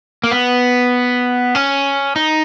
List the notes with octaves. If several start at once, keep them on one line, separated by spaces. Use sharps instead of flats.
A#3
B3
C#4
D#4